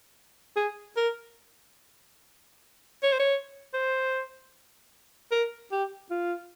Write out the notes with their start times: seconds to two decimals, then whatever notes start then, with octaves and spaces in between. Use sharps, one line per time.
0.56 G#4
0.97 A#4
3.03 C#5
3.12 C5
3.20 C#5
3.74 C5
5.32 A#4
5.72 G4
6.11 F4